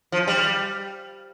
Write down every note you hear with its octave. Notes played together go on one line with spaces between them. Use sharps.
F3
G3